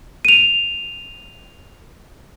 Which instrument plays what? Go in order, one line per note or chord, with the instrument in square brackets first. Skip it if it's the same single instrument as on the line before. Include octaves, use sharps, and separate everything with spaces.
[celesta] D#7 F7